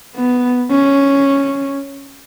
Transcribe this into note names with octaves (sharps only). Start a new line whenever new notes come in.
B3
C#4